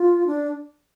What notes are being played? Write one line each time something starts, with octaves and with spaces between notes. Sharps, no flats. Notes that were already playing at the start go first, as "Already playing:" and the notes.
Already playing: F4
D4